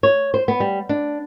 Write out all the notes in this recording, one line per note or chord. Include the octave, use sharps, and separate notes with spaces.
C#5
C5
B3
G3
D4